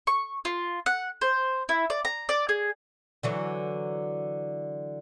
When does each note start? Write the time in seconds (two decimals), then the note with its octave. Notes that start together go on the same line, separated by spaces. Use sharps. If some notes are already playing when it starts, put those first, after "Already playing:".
0.07 C#6
0.45 F4
0.86 F#5
1.21 C5
1.69 E4
1.90 D5
2.05 A#5
2.29 D5
2.49 G#4
3.23 D3 E3 F#3